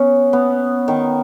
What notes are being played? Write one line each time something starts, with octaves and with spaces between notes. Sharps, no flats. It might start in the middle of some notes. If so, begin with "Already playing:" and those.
Already playing: B3 C#4
B3
D#3